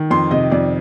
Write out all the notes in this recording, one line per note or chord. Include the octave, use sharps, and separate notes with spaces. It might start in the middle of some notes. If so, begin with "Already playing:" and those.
Already playing: D#3
F2 C6
C3 D#5
F2 D5